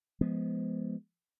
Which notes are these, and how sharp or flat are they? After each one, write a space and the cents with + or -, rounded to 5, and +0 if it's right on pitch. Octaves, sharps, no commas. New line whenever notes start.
F3 -15 G#3 +15 B3 +0